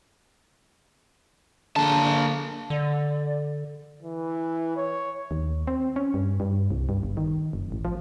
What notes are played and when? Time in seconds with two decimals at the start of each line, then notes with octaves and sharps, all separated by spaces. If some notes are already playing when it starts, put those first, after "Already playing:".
1.76 D3 A#3 A5
2.70 D3 D5
4.03 E3
4.77 C#5
5.31 D#2
5.67 C4
5.96 C#4
6.14 G2
6.40 G2
6.71 C2
6.89 G2
7.03 G1
7.17 D#3
7.53 F#1
7.72 A1
7.85 F3